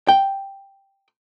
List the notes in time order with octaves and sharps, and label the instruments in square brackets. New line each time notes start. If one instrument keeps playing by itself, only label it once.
[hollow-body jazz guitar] G5